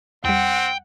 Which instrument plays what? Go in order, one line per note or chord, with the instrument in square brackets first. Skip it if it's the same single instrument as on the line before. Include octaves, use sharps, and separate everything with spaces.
[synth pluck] E2 G3 [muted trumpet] C4 [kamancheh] F#5 [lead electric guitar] G5